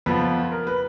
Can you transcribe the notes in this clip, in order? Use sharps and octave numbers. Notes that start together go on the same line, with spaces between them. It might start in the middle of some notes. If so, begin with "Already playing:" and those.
F2 F3 B3 B4
A#4
B4